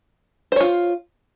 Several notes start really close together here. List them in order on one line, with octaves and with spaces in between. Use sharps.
C5 C#5 F4